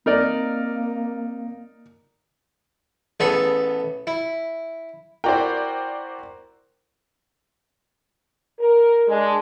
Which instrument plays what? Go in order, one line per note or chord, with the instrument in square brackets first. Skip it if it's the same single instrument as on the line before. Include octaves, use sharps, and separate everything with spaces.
[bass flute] A#3 [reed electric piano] C4 [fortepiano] D#4 A#4 D5
[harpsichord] A1 B3 G#4 A4 E5 B5
E4
[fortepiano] E4 F#4 A#4 [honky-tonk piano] C5 D5 G5
[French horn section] A#4
G#3 D4